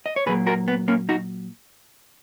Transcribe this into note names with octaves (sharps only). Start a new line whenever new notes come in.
D#5
C#5
A#2 F#3 A#3 G#4 B4
F#4 A#4
B3
A#3 C#4
D#4 F#4